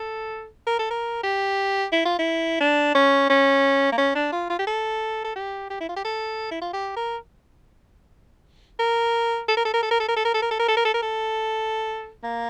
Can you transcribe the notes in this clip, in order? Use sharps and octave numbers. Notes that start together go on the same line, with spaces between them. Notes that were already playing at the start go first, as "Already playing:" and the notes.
Already playing: A4
A#4
A4
A#4
G4
E4
F4
E4
D4
C#4
C#4
A#3
C#4
D4
F4
F4
G4
A4
A4
G4
G4
E4
F4
G4
A4
E4
F4
G4
A#4
A#4
A4
A#4
A4
A#4
A4
A#4
A4
A#4
A4
A#4
A4
A#4
A4
A#4
A4
A#4
A4
A#4
A4
A#3